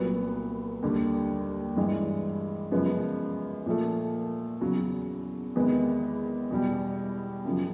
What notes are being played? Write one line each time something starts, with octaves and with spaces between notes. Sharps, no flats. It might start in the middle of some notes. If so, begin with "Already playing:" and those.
Already playing: C2 A#2 F#3 B3
D#2 D3 G3
G2 E3 G#3
F#2 C#3 F3 G#3 B3
A#2 F3 A3
E2 C#3 F#3
E2 C3 D#3 G#3 B3
E2 B2 G3
F#2 C#3 F3